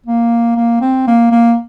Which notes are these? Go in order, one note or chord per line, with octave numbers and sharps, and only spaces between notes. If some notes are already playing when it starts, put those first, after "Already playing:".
A#3
A#3
C4
A#3
A#3